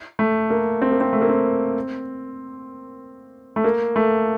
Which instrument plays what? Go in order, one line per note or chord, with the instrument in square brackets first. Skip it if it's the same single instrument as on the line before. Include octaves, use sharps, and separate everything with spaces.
[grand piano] A3
A#3
C4
A#3
C4
A3
A#3
C4
A3
A#3
A3